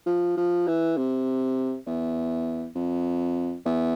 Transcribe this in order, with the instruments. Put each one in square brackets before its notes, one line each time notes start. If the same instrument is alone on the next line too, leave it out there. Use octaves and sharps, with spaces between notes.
[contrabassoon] F3
F3
E3
C3
E2
F2
E2